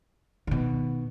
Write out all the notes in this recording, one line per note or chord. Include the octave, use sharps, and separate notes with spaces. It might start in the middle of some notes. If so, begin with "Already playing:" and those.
B2 D#3